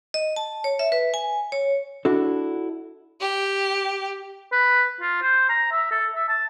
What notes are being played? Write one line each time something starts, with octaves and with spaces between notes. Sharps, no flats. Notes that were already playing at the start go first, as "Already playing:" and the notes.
D#5
A5
C#5
E5
B4
G#5
C#5
D4 E4 F#4 A4
G4
B4
F4
C5
A#5
E5
A4
E5
A5